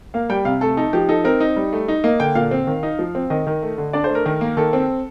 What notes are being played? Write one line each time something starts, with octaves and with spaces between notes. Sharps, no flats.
A#3 F5
G3 G5
C3 F5
A3 A4
D#4 A4
F3 G4
D#4 A4
C4 A#4
D#4
G3
A3
D#4
A#3 D#5
D3 G5
A#2 F5
C4
D#3
D#4
F3
C4
D#3 D#5
D#3
A3
D3
D4 D5
C5
A3
A#4
D#3
A#3
D#3 A4
C4